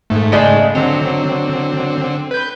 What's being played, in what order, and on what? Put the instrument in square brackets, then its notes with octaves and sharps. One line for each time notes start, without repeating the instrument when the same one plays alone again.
[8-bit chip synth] G#2 A3
[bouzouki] C#3 G#3 D4
[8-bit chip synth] D3 C4 [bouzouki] F#3
[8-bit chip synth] B4 G6